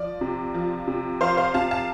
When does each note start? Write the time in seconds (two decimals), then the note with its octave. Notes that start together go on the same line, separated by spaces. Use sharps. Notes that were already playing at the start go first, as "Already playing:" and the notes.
Already playing: F3 D5
0.21 C3
0.54 F3
0.88 C3
1.20 F3 C5 F5
1.37 C5 F5
1.54 C3 F5 A5
1.71 F5 A5